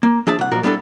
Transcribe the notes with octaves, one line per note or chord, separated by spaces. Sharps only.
A#3
F3 D4 G#4 E5 A5
C2 F#5
B1 A#2 F3 F#4 A#4
G3 B3 D4 E4 F#4 A4